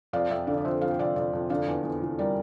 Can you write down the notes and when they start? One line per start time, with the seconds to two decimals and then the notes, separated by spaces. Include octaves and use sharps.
0.13 F2 D5 F5
0.30 F2 E5 G5
0.47 D3 D5 F5
0.58 D5
0.64 F2 C5 E5
0.82 F2 F5
0.91 G5
0.99 F2 D5 F5
1.16 F2 D5 F5
1.33 F2
1.50 D3 D5 F5
1.67 E2
1.84 E2
2.02 E2
2.19 G3 A#4 D5